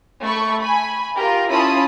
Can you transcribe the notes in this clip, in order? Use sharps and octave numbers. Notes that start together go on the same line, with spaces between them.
A3 B5 C#6
G#5 B5
F4 G4 A#4
C#4 E4 F4 A5 B5 D#6